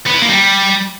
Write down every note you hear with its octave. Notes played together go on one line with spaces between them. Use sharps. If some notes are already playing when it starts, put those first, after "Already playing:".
B3
E4
A#3
G3